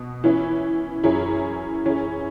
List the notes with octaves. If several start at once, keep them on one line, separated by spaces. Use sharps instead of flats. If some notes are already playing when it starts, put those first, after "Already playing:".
Already playing: B2
E3 C#4 E4
F#2 E3 C#4 E4 G#4
E3 C#4 E4 G#4